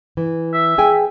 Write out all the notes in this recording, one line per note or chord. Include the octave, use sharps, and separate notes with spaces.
E3
E5
G#4 G5 G#5